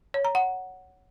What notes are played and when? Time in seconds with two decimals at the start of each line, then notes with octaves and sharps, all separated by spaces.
0.14 C#5
0.25 A#5
0.35 F#5